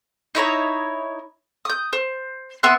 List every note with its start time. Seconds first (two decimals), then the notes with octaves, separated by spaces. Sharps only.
0.35 D#4 E4 C#5 A#5
1.65 D#6 G6
1.93 C5
2.63 B3 E5 C6 F#6